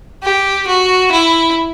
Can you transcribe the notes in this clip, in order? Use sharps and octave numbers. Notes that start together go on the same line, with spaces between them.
G4
F#4
E4